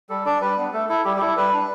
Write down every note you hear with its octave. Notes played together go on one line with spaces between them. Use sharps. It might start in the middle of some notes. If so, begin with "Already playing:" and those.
G3 A4
D4 D5
G3 B4
B3 D4
A3 A4
E4 A4
G3 G4
G4
E4 A4
G3 B4
D4